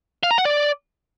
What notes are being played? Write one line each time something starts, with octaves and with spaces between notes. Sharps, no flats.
F5
A#5
F#5
D5